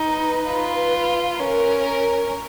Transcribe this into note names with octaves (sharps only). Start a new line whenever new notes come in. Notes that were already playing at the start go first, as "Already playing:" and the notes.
Already playing: D#4
B4
F4
C#4 A#4